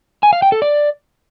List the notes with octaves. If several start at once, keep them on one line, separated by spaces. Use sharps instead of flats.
G#5
F5
G5
A4
D5